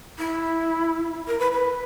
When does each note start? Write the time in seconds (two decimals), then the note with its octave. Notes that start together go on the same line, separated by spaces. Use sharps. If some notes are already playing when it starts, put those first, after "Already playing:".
0.18 E4
1.28 A#4
1.39 B4
1.52 B4